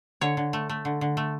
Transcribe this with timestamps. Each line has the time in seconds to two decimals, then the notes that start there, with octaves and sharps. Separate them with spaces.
0.21 D3 C#5
0.37 D3
0.53 A3
0.69 A3
0.85 D3
1.01 D3
1.17 A3